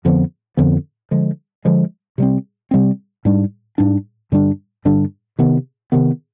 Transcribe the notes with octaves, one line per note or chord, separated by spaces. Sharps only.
F2 D3 F3 B3
F2 D3 F3 B3
D3 F3 G#3
D3 F3 G#3
C3 G3 C4
C3 G3 C4
G#2 G3 D4
G#2 G3 D4
G2 D3 G3 D4
G2 D3 G3 D4
C3 D#3 B3
C3 D#3 B3